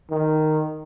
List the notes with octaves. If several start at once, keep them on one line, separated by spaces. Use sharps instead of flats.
D#3